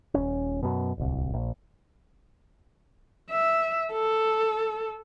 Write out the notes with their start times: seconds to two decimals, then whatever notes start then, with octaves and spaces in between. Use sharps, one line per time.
0.14 D#1 C#4
0.63 F#2 B2
0.98 D1 C2
1.33 A#1
3.31 E5
3.93 A4